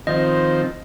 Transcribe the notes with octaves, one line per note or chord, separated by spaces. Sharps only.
D#3 F3 C4 D#5